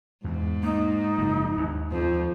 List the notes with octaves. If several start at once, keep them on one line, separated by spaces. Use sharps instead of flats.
E2 G#2
A#3 D#4
F#1 F3
D#2
F2 C5